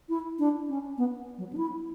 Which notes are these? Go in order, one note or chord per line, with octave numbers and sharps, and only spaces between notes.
E4
D4
C#4
B3
F#3
D4
E4